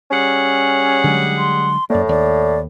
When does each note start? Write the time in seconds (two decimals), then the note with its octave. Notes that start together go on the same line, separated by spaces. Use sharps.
0.11 G3 C#4 G#4 F#5
1.04 D3 F#3 G#3
1.38 C6
1.90 F#2 A2 A#3 D5
2.09 D#2 D5